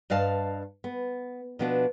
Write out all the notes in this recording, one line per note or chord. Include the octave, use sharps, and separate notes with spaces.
G2 B4 D#5 F5 A5
B3
B2 F3 B3 D4 F#4